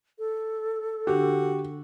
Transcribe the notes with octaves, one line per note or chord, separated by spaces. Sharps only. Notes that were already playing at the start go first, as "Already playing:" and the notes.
A4
D3 D4 F#4 G4